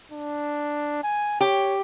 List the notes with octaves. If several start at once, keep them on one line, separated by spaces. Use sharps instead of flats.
D4
G#5
G4 C#5